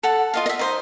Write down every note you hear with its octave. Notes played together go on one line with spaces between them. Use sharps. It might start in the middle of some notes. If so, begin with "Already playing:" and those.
A4 F#5 A5
F4 D#5 F5
D#5 E5
D#4 C5 D#6